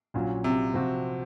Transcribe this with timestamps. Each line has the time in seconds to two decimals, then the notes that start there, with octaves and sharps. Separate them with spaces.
0.14 A#1 A#2 F#3 C#4 F4
0.44 C3
0.74 C3 F3 C4 F#4